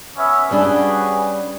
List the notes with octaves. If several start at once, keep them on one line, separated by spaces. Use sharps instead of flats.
B3 C#4 E5
G3 C#4 D4 F#4 G#4 B4